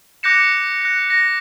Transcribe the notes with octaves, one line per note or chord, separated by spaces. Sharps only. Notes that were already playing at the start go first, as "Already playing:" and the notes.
D6 F#6 G6 A#6 C#7 E7
F#6 A#6
A#6